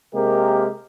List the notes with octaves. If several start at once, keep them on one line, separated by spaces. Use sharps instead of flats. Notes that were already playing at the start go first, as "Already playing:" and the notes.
C3 G#3 A#3 G4 A#4